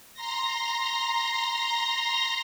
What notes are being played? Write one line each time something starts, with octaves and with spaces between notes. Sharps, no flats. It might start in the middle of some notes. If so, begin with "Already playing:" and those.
A#5 C6 A#6